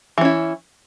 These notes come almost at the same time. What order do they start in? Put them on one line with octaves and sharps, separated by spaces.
E3 C#4 E4